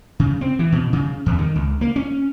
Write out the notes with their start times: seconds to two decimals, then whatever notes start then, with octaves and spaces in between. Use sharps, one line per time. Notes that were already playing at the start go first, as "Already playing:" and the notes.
0.19 C#3
0.41 C4
0.59 E3
0.72 B2
0.93 C#3
1.26 E2
1.39 D#3
1.55 C#2
1.81 A#3
1.96 C#4